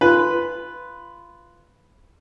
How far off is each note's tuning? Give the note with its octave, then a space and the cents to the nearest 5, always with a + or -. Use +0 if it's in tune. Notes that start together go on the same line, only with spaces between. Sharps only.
F4 -15 B4 +0